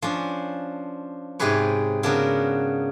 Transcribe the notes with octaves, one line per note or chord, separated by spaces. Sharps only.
F3 C#4 D4
G#2 C3 G4 G#4 B4 C#5
C#3 B3 D4 F#4 A#4